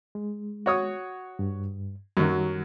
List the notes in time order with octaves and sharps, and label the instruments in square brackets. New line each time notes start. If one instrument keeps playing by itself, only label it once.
[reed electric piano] G#3
[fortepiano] F#4 C#5 D#6
[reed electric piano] G2
[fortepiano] F#2 F#3 [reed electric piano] D#3 G3